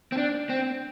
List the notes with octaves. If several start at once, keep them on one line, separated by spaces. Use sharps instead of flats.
C4
D4
C4